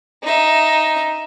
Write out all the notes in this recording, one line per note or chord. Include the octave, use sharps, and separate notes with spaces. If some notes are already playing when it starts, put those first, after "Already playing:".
D#4 E5